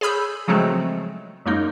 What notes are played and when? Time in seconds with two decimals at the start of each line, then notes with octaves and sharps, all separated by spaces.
0.01 G#4 C#5 B5 E6 G6
0.48 C#3 F3 F#3 G#3 A3 C4
1.46 F#2 G#3 A#3 D#4